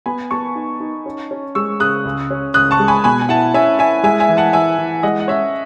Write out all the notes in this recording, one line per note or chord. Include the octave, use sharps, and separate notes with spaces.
B3 G#5 B5
B3 A5 C#6
D#4
D#4
C#4
C#4
G#3 C#6 E6
C#3 D#6 F#6
C#2
C#4
C#2 D#6 F#6
A5 C#6
G#3
G#5 B5
B2 G#5 B5
G#5
E4 F#5 A5
C#4 E5 G#5
E4 E5 G#5
G#3 E5 G#5
E5 G#5
E3
F#5 A5
E3 E5 G#5
E3
G#3 D#5 F#5
F#5
C#4 C#5 E5